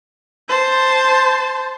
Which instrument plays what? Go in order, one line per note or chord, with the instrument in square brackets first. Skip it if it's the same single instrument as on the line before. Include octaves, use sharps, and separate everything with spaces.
[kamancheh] C5 A5